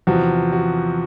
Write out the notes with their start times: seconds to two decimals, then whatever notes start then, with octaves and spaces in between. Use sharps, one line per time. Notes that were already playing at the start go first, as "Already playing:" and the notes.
0.07 E2 C3 F3 F#4
0.52 F#4